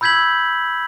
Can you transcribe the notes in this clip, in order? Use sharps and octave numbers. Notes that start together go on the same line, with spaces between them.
B5 E6 G6 G#6 B6 F#7